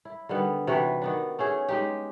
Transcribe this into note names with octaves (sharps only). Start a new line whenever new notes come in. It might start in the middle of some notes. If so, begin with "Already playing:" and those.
E4
D3 D#3 G3 B3
C3 E3 F#4 B4
D#3 B3 D4
A3 C#4 G#4
G#3 D#4 G4